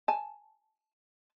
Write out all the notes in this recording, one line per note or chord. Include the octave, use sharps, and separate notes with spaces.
G#5 A5